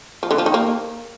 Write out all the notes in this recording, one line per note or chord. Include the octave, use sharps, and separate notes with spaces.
F3
D3
F3
D#3
A#3